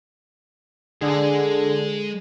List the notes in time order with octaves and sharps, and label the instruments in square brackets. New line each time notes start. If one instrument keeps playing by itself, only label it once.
[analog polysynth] D3 [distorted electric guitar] G#3 [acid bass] G#4